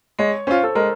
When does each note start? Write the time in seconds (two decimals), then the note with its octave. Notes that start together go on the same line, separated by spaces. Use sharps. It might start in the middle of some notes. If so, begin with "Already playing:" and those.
0.19 G#3 C#5
0.47 C#4 F4 C5
0.63 A4
0.75 G#3 A#4